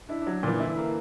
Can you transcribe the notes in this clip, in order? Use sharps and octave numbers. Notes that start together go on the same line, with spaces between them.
D4 E4
D4
F#3
A#2 E3
D3 E4
A#3